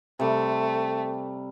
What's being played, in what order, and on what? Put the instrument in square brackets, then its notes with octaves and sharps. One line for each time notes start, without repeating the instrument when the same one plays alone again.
[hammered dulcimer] C3 G3 [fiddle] A3